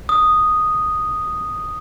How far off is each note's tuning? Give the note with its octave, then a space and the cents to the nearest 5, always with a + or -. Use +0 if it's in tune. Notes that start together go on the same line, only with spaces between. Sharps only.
D#6 -5